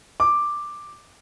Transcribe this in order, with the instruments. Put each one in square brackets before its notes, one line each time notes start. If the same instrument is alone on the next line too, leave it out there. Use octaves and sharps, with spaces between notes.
[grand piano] D6